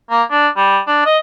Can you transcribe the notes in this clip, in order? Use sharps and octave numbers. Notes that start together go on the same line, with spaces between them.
A#3
D4
G3
D4
D#5